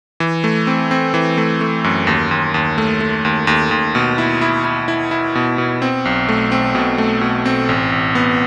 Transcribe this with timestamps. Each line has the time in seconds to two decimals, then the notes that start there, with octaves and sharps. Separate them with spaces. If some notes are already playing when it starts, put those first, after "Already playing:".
0.20 E3
0.44 A3
0.67 C4
0.91 C4
1.14 E3
1.38 A3
1.61 A3
1.84 F#2
2.07 D#2
2.31 D#2
2.54 D#2
2.78 A3
3.01 A3
3.25 D#2
3.47 D#2
3.71 D#2
3.95 B2
4.18 E4
4.41 E4
4.65 E4
4.88 E4
5.11 E4
5.35 B2
5.58 B2
5.82 C4
6.05 B1
6.29 A3
6.52 C4
6.75 B2
6.98 A3
7.21 B2
7.46 C4
7.69 A1
7.92 A1
8.15 B3